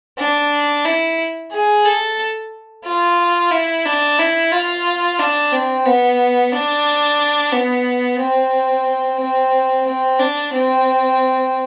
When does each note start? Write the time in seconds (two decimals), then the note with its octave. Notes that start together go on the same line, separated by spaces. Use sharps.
0.18 D4
0.85 E4
1.52 G#4
1.86 A4
2.85 F4
3.52 E4
3.86 D4
4.19 E4
4.52 F4
5.19 D4
5.52 C4
5.86 B3
6.52 D4
7.52 B3
8.19 C4
9.20 C4
9.86 C4
10.19 D4
10.53 C4